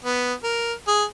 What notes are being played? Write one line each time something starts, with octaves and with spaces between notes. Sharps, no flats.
B3
A#4
G#4